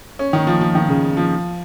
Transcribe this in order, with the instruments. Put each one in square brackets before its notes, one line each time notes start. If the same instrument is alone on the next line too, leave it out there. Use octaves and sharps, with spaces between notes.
[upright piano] C#4
D#3
F3
F3
D#3
C#3
F3